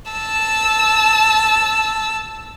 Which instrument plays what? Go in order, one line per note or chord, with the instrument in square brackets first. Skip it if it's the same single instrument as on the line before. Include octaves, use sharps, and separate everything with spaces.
[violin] A5 E6